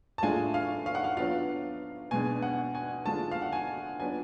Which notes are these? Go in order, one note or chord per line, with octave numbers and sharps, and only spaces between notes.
A5
A2 G#3 D4 F4 G#5
F5
F5
F#5
F5
F#3 B3 D4 F4 F5
B2 G#3 D4 G#5
F#5
G#5
D3 G#3 D4 F4 A5
F5
F#5
G#5
F#3 B3 D4 F4 G#5